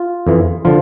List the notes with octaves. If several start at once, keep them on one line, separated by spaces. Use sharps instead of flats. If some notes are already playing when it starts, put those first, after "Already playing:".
Already playing: F4
F2 E3
D3 F3 F4